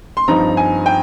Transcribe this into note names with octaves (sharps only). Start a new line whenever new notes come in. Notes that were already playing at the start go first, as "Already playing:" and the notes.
C6
G2 F3 C4 D#4 A#5
G#5
G5